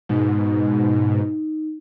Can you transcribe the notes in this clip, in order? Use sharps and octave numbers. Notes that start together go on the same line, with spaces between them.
G#2 B2 D#4